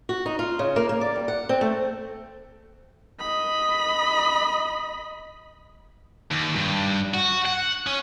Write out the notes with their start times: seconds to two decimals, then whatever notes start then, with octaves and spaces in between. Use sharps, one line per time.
0.09 F#4
0.26 D#4
0.39 F4
0.59 C#3
0.76 A#3
0.89 A#3
1.01 D5
1.16 G3
1.28 F#5
1.49 C4
1.61 A3
3.20 D#5 B5
6.31 D#2
6.55 G2
7.14 F#4
7.46 F#5
7.87 C#4